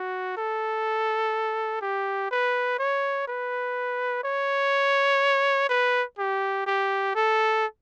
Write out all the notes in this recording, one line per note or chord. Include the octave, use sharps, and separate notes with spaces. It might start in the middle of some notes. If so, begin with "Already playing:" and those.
Already playing: F#4
A4
G4
B4
C#5
B4
C#5
B4
G4
G4
A4